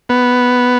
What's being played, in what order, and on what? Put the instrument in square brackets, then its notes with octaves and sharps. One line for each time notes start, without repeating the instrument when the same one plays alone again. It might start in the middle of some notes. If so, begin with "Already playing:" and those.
[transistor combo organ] B3